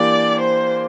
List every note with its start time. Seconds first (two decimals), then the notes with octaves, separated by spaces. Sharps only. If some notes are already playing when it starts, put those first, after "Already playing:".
Already playing: E3 A#3 D4 G4 D5
0.40 C5